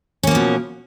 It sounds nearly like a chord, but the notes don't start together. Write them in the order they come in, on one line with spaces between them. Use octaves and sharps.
C#4 A#3 F3 B2